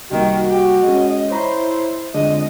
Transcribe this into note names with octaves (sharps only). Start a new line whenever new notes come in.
C2 D#3 G3 A#3 F#4
G4
G#3 C#4 D#5
E4 C5 C#5 A#5 B5
F2 D3 G#3 D4 D#5